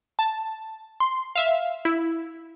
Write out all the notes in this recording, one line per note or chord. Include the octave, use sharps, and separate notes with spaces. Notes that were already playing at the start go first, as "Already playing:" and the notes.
A5
C6
E5 F5
E4